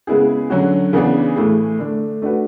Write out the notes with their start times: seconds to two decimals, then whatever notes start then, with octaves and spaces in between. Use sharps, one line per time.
0.07 C#3 G#3 B3 E4 G#4
0.50 D3 F#3 C#4 F#4
0.93 C#3 E3 B3 D4 G#4
1.36 A2 E3 A3 E4 G#4
1.79 D3 A3 D4
2.22 A3 D4 F#4 B4